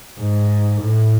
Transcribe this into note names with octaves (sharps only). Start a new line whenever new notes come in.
G#2
A2